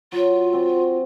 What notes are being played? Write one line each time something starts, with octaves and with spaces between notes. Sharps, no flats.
F#3 F4
C4 F#4